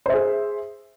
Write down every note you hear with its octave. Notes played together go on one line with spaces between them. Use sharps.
G#4 C5 E5